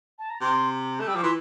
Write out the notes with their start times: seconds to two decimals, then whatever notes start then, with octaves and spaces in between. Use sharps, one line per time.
0.19 A5
0.30 A#5
0.41 C3 C6
1.00 A3
1.07 G3 E6
1.15 F3 D6
1.23 E3 C6